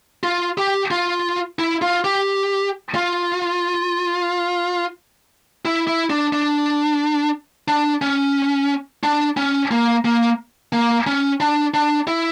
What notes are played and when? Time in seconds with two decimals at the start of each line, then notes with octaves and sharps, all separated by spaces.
0.23 F4
0.58 G4
0.91 F4
1.59 E4
1.82 F4
2.04 G4
2.95 F4
5.65 E4
5.87 E4
6.10 D4
6.33 D4
7.68 D4
8.02 C#4
9.03 D4
9.37 C#4
9.71 A#3
10.05 A#3
10.73 A#3
11.07 C#4
11.40 D4
11.74 D4
12.07 E4